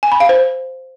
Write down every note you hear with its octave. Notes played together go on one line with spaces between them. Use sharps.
G#5
B5
F5
C5